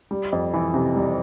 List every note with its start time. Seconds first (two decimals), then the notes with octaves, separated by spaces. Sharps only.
0.11 G3
0.32 F2
0.54 E3
0.74 C3
0.96 G3